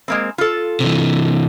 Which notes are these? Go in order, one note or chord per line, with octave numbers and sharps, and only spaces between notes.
G#3 A#3 C4
F4 A4
C3 E3